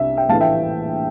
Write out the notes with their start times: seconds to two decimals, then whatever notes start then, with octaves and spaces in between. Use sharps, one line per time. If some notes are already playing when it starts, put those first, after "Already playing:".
Already playing: C2 C3 G3 D4 E5
0.17 E5 G5
0.29 A#1 A2 E3 A3 F5 A5
0.41 E5 G5